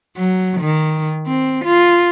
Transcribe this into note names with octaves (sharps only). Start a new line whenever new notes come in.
F#3
D#3
C4
F4